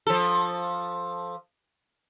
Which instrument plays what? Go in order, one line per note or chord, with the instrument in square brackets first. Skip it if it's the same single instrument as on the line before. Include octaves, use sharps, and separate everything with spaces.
[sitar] F3 A4